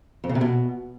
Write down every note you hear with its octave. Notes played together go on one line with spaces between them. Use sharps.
F2
C#3
C3
B2